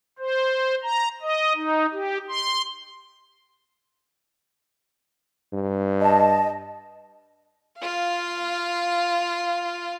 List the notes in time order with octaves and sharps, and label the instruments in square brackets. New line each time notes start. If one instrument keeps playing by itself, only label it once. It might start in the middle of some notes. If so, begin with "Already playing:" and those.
[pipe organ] C5
A#5
D#5
D#4
G4
C6
[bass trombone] G2
[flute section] D#5 A5
[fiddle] F4 F5